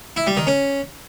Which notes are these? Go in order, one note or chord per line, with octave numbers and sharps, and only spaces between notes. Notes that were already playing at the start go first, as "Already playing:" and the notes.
E4
G3
D#3
C#4